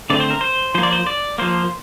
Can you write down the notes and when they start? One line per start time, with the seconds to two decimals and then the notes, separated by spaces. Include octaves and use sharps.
0.10 D3 A3 C4 D5
0.20 C5
0.30 A#4
0.41 C5
0.75 F3 A#3 C5
0.83 D5
0.92 C5
1.07 D5
1.38 F3 A#3 C5